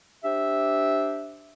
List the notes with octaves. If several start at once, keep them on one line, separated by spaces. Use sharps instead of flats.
D4 G4 C5 E5